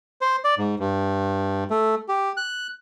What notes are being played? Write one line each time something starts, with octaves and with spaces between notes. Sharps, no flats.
C5
D5
G#2
G2
A3
G4
F#6